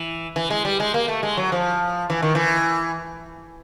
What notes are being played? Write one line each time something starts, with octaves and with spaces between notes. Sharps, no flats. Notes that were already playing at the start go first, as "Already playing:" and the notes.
Already playing: E3
E3
G#3
G3
G#3
A#3
A3
G#3
F#3
F3
E3
D#3
E3